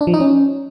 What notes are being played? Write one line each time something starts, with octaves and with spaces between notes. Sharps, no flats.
D4
F3
D#4
C#4